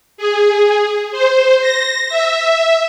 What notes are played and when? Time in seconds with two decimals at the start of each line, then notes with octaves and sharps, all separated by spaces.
0.17 G#4
1.11 C5
1.61 A#6
2.09 E5